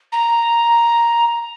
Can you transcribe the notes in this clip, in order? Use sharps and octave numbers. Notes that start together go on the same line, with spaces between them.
A#5